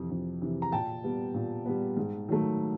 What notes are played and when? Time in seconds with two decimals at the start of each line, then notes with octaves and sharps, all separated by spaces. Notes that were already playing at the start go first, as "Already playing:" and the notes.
Already playing: F2 C3 E3
0.11 F2
0.41 C3 E3
0.62 A#5
0.72 A#2 G5 A5
1.04 G3 B3
1.34 A#2
1.66 G3 B3
1.97 G#2
2.29 D#3 F#3 A3